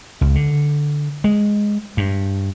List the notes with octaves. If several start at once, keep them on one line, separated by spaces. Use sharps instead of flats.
C#2
D3
G#3
G2